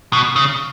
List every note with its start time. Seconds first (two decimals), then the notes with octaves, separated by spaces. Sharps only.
0.13 B2
0.36 C#3